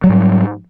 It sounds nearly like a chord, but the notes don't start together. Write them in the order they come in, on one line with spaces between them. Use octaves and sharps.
F#3 G3 G#2